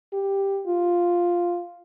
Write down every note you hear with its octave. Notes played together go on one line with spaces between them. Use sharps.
G4
F4